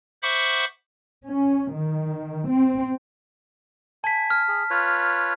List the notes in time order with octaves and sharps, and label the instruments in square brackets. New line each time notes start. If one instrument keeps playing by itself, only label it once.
[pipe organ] C5 E5 F#5 B5 C#6 D6
[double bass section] C#4
D#3
C4
[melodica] G#5 [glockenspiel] A5 B6
[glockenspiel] F6
[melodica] G#4
F4 B4 C#5